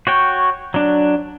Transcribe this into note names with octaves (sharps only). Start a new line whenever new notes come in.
F#4 C#5 G5
F#3 D4